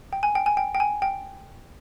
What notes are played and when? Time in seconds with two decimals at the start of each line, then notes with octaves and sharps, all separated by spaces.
0.13 G5
0.23 G#5
0.35 G5
0.46 G#5
0.57 G5
0.75 G5
0.80 G#5
1.02 G5